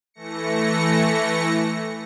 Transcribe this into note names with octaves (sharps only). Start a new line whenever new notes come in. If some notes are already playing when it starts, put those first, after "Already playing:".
E3 A3 A#6 C#7